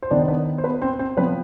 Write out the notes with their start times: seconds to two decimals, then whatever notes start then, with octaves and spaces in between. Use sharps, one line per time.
0.03 C5
0.10 D#3 B3 D4 D5
0.28 B3 B4
0.58 C5
0.64 B3 B4
0.82 C4 C5
0.99 C4 C5
1.17 F3 B3 C4 B4